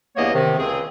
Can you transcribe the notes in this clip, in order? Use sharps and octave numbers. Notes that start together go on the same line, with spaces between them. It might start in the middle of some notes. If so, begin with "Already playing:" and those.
E2 G2 A#3 B3 C#5 D#5
C3 D#3
C#2 C4 G#4